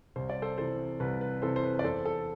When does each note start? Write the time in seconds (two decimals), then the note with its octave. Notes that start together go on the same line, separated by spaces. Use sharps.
0.16 C2 C5
0.30 D5
0.42 A4 C5
0.58 C3 E3 A4 C5
1.00 C2 B4
1.21 B4
1.42 C3 E3 A4 C5
1.56 C5
1.64 B4
1.79 D5
1.84 E2 A4 C5
2.05 A4